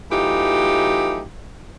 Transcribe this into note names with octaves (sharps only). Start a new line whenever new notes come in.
E3 F#3 A3 D#4 F4 G4